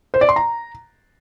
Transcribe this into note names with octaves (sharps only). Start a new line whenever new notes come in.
C5
D5
C6
A#5